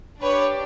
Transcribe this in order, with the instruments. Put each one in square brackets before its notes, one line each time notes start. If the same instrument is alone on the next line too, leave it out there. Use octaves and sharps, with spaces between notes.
[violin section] D4 G4 B4 C#5